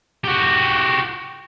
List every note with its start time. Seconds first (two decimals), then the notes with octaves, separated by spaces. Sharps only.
0.24 F#4 G4